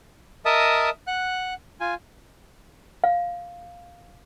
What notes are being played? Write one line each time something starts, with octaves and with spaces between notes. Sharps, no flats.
A#4 D#5 E5 A5 D#6
F#5 F#6
F4 G#5
F5